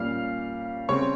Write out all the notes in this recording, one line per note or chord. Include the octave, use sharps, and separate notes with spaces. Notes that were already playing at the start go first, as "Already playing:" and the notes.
Already playing: A#2 G3 C#4 F5 F6
C#3 G3 C4 C#5 C#6